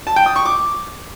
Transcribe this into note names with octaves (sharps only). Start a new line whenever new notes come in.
A5
G5
D#6
C#6
D6